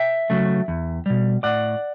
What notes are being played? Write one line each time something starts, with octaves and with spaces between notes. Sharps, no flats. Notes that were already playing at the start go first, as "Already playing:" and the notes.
Already playing: E5 G5
C#3 F#3 A3
E2
B2 G3
A2 D5 F#5